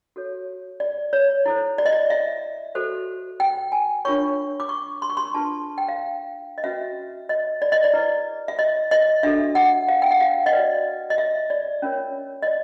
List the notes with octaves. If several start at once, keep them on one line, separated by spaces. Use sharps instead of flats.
F#4 A4 C#5
D5
C#5
E4 A4 C5
D5
D#5
D5
E5
F#4 A4 C5
G5
G#5
D4 F4 A#4 C#5 C#6
D6
C#6
C6
C#6
C6
D4 F4 G#4 B4 A5
G5
F5
D#5
C#4 F#4 B4 E5
D#5
D5
D#5
D5
E4 G#4 B4
E5
D#5
D#5
D4 F#4 A4 E5
F#5
F5
G5
F#5
F5
D#5
F#4 B4 D5
D#5
E5
D5
C#4 F4 A#4 C#5
D#5
D5